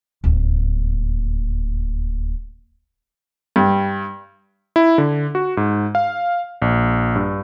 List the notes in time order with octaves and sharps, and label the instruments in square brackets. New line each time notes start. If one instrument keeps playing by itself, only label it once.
[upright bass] D1 D#2
[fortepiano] G2
[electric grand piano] E4
D3
F#4
G#2
F5
A#1
G2